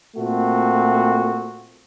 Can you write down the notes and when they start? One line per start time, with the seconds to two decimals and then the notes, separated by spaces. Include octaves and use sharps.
0.16 A#2 A3 C4 F#4